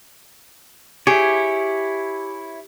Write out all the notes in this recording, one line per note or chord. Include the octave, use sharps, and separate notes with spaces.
E4 G4 G#4 C#5